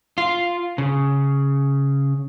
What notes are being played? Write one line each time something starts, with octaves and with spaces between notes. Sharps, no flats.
F4
C#3